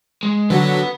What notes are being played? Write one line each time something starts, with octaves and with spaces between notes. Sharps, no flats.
G#3
D3 F#3 B4 F#5